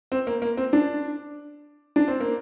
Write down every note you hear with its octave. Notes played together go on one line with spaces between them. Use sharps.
C4
A#3
A#3
C4
D4
D4
C4
A#3